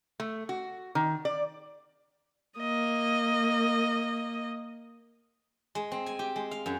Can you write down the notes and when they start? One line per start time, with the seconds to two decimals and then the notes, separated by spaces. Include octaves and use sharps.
0.20 A3
0.49 F#4
0.95 D#3
1.25 D5
2.58 A#3 D#5
5.75 G#3
5.92 C4
6.06 G#5
6.19 G4
6.36 G#3
6.51 F5
6.66 F#2